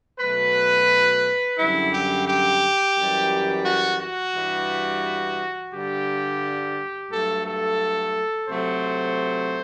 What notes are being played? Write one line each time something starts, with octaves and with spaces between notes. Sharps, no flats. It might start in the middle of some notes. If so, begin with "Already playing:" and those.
B2 F#3 A3 B4
F#2 D3 G3 E4
G4
G4
F#2 E3 G3
F#4
F#4
G2 E3 G3
G2 D3 G3 G4
G2 F#3 A3 A4
A4
C3 F#3 A3 C5